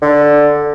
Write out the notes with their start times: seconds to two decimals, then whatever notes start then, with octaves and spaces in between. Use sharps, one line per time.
0.02 D3